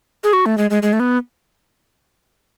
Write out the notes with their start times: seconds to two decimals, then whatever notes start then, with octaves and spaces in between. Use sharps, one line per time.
0.24 G#4
0.33 F#4
0.46 A3
0.58 G#3
0.70 G#3
0.83 G#3
0.93 A3
1.00 B3